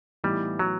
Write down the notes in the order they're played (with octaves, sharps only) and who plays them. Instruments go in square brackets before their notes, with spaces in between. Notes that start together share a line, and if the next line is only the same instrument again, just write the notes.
[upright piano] A2 E3 B3 D#4 [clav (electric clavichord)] G3
[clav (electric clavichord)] F#3